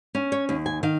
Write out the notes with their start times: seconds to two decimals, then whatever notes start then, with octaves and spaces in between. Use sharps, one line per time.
0.15 C#4
0.32 C#5
0.49 D#2
0.66 G#5
0.83 D#3 F5